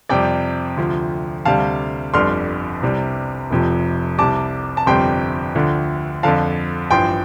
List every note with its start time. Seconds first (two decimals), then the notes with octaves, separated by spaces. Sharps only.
0.09 F2 C3 G3 D5 G5
0.77 D2 C3 F3
1.45 D2 C3 G3 F5 A5
2.14 G1 F2 D3 G3 C6 F6
2.82 C2 C3 G3
3.51 F1 F2 C3 F3
4.18 C2 C3 G3 A5 D6
4.77 A5
4.86 G1 F2 C3 G3 G5 C6
5.55 D2 D3 F3
6.23 F2 D3 F3 F5 A5
6.91 A1 G2 F3 G5 C6